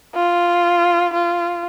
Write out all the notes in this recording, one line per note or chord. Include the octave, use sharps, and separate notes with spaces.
F4
F4